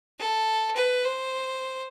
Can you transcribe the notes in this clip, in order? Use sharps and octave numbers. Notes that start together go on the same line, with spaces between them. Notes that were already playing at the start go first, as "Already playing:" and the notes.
A4
B4
C5